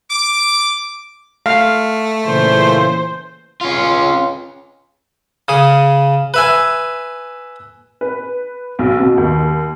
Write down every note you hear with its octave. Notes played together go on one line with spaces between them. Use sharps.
D6
A3 F5
A#2 C#3 E3 C5
C#4 F4
C#3 G#4
B4 E5 G#5
B4
B1
B2
D#2